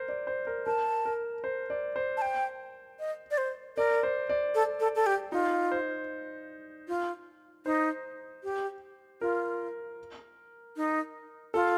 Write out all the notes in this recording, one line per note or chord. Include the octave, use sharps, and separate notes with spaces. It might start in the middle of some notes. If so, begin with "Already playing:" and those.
Already playing: A#4 C5
D5
C5
A#4
A#4 A5
A#4
C5
D5
C5
A5
G5
D#5
D5
C5
A#4 D5
C5
D5
A4
A4
A4
G4
D#4 F4
C5
F4
D#4 C5
G4
F4 A#4
D#4
F4 A4